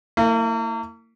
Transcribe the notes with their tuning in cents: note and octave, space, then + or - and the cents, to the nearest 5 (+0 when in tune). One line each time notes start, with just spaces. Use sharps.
A#3 -40 E4 +0